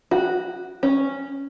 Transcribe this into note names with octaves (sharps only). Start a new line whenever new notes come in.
F#4
C#4